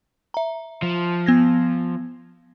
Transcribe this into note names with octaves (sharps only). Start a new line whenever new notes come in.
E5 A#5
F3
B3 G#6 A#6